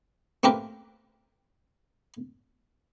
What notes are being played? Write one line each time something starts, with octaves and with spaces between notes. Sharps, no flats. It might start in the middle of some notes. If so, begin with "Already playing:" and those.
A3 A#3 C4 G4 A#4 B4